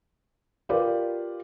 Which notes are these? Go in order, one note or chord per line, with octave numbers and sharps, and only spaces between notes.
F4 G4 A#4 B4 D5